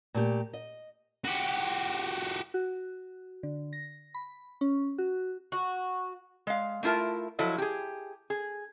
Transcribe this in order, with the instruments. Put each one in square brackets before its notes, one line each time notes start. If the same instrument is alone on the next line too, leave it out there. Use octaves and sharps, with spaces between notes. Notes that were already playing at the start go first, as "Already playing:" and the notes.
[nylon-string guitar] A#2 A3 G4
D#5
[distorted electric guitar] F#4 G4
[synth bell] F#4
D3
A#6
B5
C#4
F#4
[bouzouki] F#4
[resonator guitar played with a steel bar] G#3 F5
A3 E4 F4 A#4 A5
F3 F#3 E4 A4 D#5
G4 G#4
G#4